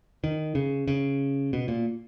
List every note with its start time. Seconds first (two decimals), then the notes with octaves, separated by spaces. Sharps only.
0.24 D#3
0.55 C#3
0.88 C#3
1.53 B2
1.68 A#2